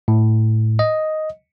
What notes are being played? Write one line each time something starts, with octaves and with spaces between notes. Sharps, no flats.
A2
D#5